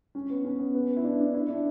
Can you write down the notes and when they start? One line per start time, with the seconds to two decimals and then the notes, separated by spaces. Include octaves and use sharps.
0.15 C#4
0.30 B3
0.45 C#4
0.59 B3
0.74 B3
0.97 E4
1.04 D4
1.20 D4
1.34 E4
1.49 D4